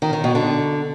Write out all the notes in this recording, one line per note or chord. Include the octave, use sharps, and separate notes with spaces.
D#3
D#3
B2
D3